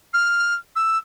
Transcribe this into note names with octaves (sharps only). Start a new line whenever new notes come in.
F6
E6